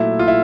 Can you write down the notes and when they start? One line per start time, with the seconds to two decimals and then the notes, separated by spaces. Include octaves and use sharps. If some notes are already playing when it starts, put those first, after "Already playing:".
Already playing: A#2 F#3 A3 E4
0.19 F4
0.28 E4